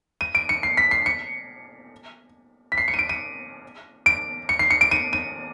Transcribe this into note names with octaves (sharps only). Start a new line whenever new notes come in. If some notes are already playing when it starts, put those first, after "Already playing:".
D#7
D7
C#7
C7
B6
C7
C#7
B6
C7
C#7
D#7
D7
D#7
D7
C#7
C7
C#7
D7
D#7
D#7